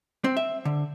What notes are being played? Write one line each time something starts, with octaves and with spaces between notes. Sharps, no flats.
C4
E5
D3